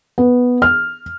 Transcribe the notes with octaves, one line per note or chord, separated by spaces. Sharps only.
B3
F6